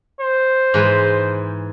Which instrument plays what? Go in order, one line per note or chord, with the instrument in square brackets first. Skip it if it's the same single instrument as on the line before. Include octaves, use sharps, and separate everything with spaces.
[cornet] C5
[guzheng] G#2 E3 B4